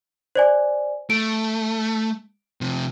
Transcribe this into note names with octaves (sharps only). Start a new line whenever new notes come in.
C5 D5 G#5
A3 D7
C3 F3